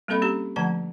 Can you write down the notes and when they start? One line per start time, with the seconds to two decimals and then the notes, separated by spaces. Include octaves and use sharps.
0.08 G3 A#3 C4 A4 D#5 B5
0.22 C#4 G4 A#5
0.56 D3 F3 A3 F#5 A5 A#5